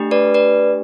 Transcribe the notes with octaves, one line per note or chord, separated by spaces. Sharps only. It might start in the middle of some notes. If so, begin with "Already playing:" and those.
Already playing: A3 D4 G4
B4 D5
B4 D5